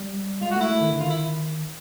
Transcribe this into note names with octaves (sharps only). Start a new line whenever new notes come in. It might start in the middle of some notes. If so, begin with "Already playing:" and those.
Already playing: G3
G#3 F4
F#4
A3 E4
A3
D#3
D3
D#3 F4
E4